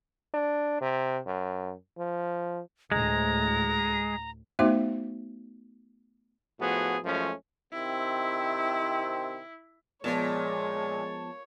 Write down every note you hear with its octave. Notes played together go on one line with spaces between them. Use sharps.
D4
C3
F#2
F3
D2 A2 G#3 A#5
A3 B3 D#4 F#4 C5 E5
A2 F3 B3 F#4 G#4
F#2 F3 G#3 A3 C#4
C3 D#3 C4 E4
A#2 F3 G#3 B3 C#5 A5